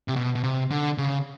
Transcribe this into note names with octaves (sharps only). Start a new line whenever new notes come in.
C3
B2
B2
C3
D3
C#3